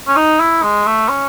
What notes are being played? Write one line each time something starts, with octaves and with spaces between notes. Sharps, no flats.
C#4
D#4
E4
G#3
A3
C#4